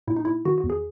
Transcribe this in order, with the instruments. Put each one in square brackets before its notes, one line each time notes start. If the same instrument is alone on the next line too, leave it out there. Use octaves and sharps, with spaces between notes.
[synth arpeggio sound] A#2 E4
D#4
A#2 E4
D#3 F#4
F#4
E2
G#4